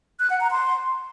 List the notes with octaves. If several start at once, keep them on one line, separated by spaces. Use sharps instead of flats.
F#6
F#5
A#5
C6